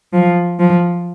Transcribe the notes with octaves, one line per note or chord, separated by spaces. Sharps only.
F3
F3